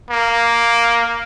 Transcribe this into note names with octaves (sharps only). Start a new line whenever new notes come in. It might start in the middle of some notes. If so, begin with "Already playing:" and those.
A#3